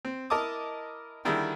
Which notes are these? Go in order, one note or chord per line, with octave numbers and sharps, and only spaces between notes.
C4
E4 A#4 D#5 A5 D6 D#6
D3 D#3 G3 E4 G#4